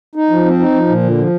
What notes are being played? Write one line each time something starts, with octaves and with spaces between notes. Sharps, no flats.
D#4
F3
C4
D#4
F3
A#2
D3
F3